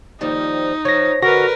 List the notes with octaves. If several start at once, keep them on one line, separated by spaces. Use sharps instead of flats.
D#2 F3 G3 D#4
F3 C#5 A#6
D3 F#4 A#4 B4 A#6